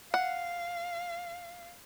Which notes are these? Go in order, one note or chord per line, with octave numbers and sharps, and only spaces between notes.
F5 F#5